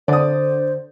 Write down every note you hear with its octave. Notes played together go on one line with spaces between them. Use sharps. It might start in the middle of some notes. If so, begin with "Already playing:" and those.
D3 C5 D5 D#6